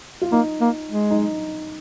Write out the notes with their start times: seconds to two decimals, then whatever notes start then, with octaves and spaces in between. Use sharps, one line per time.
0.22 F4
0.32 A#3 D#4
0.61 A#3
0.90 G#3
1.11 D#4